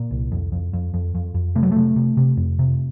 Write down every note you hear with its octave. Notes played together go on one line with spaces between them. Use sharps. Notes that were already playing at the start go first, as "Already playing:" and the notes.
Already playing: A#2
C2
F2
F2
F2
F2
F2
F2
C3 A3
F#3
C3 A3
C3
C3
F2
C3